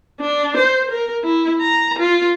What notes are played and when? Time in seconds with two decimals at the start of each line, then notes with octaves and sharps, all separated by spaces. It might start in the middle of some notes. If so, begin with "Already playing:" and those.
0.21 D4
0.57 C5
0.91 A#4
1.24 E4
1.61 A#5
1.99 F4